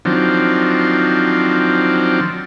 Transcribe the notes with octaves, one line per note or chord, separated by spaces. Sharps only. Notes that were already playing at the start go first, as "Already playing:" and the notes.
D#3 F3 F#3 C4 D4